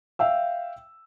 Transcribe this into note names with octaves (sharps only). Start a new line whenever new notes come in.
E5 F5 G5 E6